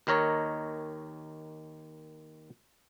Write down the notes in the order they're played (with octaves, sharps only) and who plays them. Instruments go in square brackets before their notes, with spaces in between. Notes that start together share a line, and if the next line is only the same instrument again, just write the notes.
[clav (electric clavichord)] D#2 D#3 A#4 C#5 D#5 A#5